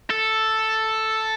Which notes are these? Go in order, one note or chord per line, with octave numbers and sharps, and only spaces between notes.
A4